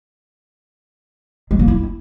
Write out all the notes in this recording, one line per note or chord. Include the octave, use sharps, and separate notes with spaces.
G#3
A#3
E4